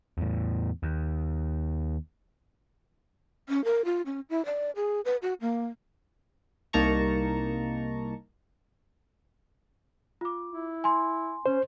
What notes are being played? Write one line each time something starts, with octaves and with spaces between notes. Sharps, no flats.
E2 A2
D#2
C#4
A#4
F4
C#4
E4
D5
G#4
B4
F#4
A#3
C2 A#3 D#4 A5 A#5 C#6
F4 D6
E4
G#5 C6
C#4 C5